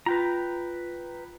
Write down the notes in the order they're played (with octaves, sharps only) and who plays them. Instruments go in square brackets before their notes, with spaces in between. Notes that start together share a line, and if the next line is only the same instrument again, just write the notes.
[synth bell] F4 [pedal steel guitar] B4 G5 A#5